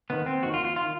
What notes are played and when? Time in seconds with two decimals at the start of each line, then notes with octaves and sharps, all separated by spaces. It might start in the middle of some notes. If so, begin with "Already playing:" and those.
0.10 D#2 D#3 B3
0.26 C4
0.43 D#2 D#3 F#4
0.54 F4
0.65 F4
0.76 D#3 F4